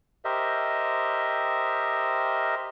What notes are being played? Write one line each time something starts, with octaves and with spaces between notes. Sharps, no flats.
G4 A#4 C5 D#5 E5